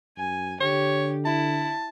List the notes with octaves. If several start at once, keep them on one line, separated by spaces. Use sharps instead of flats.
F#2 G#5
D3 G4 C#5
E4 A5